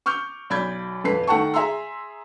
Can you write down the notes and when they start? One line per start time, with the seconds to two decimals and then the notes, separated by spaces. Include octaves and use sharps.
0.06 C#6 D6 F6 G6
0.50 B1 D5 B5 G6 G#6
1.04 D#1 F2 B4 C7
1.27 D#3 A3 F#5 G5 A5 C#6
1.54 G#4 E5 A#5 C6 E6